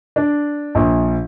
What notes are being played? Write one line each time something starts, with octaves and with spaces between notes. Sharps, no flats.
D4
A#1